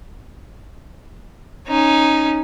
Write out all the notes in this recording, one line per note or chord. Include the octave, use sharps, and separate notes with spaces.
C#4 D#4